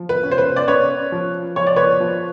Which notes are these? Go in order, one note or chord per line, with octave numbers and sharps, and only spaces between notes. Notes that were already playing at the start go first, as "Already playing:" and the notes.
Already playing: F3
B4
C#4
C5
B4
D5
C#4 B4 C#5
F3
F3 C#5
D5
B4 C#5
F3